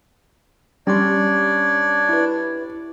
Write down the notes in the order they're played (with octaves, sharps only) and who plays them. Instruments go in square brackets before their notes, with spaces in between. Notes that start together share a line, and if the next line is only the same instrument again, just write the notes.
[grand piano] G3 [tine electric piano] C#4 C6 [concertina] D4 C#5 D5
[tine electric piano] E4 B4